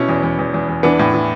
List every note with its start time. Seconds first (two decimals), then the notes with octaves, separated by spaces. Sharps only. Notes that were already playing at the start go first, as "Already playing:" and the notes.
Already playing: B2 C#4 E4
0.09 E2
0.23 E2
0.39 E2
0.54 E2
0.69 E2
0.83 E3 B3 D4
0.99 A2
1.14 E3